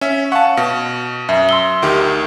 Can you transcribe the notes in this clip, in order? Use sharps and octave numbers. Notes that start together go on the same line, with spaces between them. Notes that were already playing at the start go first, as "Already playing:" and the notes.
C#4 E5
F5 F#5 A5 C#6
B2
F#2 E5
C6 E6 G7
D2 D#3 G4